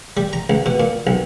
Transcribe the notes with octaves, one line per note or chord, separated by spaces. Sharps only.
G3
A#5
C#2
B2
A#2
B1